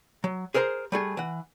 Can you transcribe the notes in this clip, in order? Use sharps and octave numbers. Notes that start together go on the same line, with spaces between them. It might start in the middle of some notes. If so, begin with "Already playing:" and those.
F#3
G#4 A#4 C5 G#5 A#5
G3 A3 G#4
E3 F#5